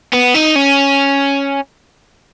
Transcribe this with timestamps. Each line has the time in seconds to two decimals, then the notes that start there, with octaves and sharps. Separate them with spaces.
0.13 B3
0.34 D#4
0.55 C#4